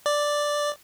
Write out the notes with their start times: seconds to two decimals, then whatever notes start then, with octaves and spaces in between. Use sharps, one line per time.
0.06 D5